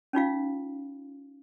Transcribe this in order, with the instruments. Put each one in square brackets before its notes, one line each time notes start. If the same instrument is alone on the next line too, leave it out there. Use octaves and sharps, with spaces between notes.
[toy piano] C#4 D#4 F4 F5